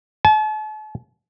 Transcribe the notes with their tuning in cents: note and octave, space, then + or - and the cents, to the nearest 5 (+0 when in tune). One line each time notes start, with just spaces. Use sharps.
A5 -40